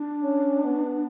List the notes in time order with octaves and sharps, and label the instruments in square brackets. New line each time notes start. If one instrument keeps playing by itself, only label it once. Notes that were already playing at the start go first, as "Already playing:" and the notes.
Already playing: [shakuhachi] D4
[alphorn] C#4
B3